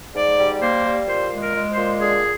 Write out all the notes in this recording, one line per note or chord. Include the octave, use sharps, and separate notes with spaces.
G#2 D5
G3
A#3 C5
G3
A#2 C5
G#3
A#4
G#3
C5
A#2
D3 G#4